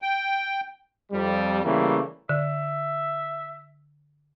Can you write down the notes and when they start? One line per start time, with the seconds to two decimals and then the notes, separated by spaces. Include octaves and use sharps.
0.02 G5
1.12 F2 G3
1.64 C#3 E3 G3 A3 A#3
2.29 D3 E5